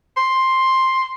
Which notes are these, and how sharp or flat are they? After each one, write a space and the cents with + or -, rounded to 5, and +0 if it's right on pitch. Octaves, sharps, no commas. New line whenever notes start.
C6 +5